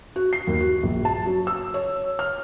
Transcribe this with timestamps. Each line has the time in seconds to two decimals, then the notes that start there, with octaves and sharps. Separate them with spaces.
0.16 F#4
0.33 C7
0.47 D#2
0.60 F#4
0.83 A#1
1.05 A5
1.26 F#3
1.47 E6
1.74 C#5
2.19 F6